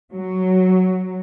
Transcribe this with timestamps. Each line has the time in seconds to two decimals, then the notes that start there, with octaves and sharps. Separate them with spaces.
0.14 F#3